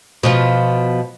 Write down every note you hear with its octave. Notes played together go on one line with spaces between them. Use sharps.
B2 F3 F4